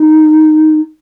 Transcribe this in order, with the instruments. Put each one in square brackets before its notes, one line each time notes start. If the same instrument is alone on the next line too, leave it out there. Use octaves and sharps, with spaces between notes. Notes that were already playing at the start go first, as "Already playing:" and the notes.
Already playing: [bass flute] D#4